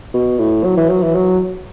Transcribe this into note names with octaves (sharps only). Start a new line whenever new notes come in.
B2
A2
F#3
E3
F#3
E3
F#3